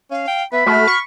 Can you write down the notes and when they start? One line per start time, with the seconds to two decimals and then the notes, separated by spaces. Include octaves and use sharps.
0.11 C#4 F5
0.28 G5
0.52 B3 E5 B5
0.66 A3 F#4 F6
0.87 C#6